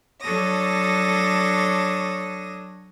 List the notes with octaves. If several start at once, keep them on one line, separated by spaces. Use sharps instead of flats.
F#3 D4 A4 C#5 D#6 A#6